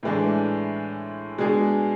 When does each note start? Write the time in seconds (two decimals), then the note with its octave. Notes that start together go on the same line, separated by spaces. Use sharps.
0.03 A2 E3 G#3 D4
1.38 B2 G#3 D4 G#4